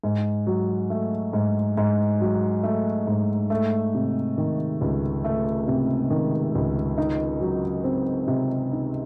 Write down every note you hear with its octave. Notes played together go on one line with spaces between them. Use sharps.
G#2
F#3
A3
G#2
G#2
F#3
A3
G#2
A3
C3
D#3
C#2
A3
C3
D#3
C#2
D#4
F#3
C4
C3
D#4